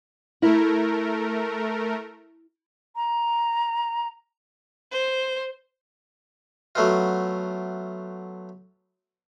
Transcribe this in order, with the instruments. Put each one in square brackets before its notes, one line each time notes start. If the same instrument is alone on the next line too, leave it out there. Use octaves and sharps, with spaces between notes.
[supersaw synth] A3 A#4 [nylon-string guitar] E4
[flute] A#5
[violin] C5
[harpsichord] F#3 A3 B3 F4